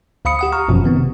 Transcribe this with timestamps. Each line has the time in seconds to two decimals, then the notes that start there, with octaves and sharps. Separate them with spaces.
0.25 D2 F5 B5 D#6 C#7
0.39 G4 F#5 D#6
0.53 A#5 C#6 D#6 F6
0.68 G1 F#2 B2 F3
0.84 D#3 B3 C4
0.97 C3